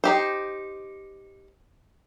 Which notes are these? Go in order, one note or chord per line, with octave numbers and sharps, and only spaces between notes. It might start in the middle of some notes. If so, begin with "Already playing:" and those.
D#4 G4 C5